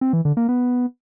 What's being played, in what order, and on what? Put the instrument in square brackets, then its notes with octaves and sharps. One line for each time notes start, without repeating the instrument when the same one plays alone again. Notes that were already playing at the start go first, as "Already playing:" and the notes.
[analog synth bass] C4
E3
D3
A#3
B3